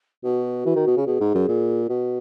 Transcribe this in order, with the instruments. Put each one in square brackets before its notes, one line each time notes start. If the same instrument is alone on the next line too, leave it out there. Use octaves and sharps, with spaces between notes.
[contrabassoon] B2 [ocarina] F#4
[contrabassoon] E3
D#3
B2
C#3
[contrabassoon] B2 [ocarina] G#4
[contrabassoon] G#2
F#2
A#2
B2